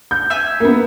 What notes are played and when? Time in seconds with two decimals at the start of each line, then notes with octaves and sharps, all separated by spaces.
0.11 G6
0.30 E5 G#5
0.60 A#3 B3